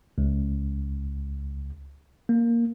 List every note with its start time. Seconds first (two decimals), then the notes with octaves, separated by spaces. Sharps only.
0.18 C#2
2.29 A#3